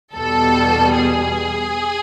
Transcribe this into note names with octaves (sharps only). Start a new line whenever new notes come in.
E2 B2 G3 A4
G#4